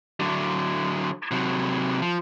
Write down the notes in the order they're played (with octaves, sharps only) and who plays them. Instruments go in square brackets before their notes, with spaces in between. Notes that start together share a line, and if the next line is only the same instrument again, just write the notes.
[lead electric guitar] D3 F#3
C3 F#3
F3